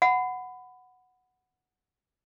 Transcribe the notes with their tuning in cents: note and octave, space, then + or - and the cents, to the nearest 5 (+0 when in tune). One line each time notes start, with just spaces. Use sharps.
F#5 +0 B5 +20